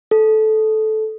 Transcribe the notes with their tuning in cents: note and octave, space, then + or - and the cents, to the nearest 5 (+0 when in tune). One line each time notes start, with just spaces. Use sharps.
A4 -15